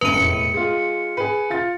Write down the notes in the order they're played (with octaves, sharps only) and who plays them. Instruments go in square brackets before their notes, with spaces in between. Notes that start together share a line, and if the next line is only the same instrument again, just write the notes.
[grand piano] F1 G2 F7 [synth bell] B4 D#7
[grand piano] E1 A2 [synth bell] C#7
[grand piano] G#3 F4
G#4 B4
F4 A6